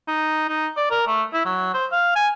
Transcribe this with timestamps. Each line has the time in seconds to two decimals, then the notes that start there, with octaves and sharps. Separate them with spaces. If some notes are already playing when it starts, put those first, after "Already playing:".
0.08 D#4
0.48 D#4
0.77 D5
0.91 A#4
1.07 A3
1.33 E4
1.46 F#3
1.74 C5
1.92 F5
2.15 G#5